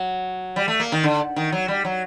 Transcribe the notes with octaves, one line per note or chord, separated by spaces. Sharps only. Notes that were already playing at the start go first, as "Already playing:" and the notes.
Already playing: F#3
G3
A3
A#3
D#3
D3
D#3
F#3
G3
F#3